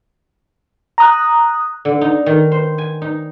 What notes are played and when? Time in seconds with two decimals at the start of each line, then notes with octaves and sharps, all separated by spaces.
0.98 A#5 D#6 F#6
1.85 D3
2.01 D#4
2.26 D#3
2.52 C5
2.78 G#5
3.02 D#4